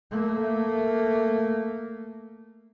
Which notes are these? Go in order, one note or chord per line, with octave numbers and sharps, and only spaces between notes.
A3 A#3